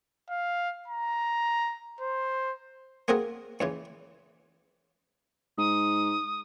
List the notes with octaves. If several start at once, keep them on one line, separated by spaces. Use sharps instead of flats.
F5
A#5
C5
A#3 C4 F#4 G#4 A#4
C#2 C#3 E3
G#2 D#6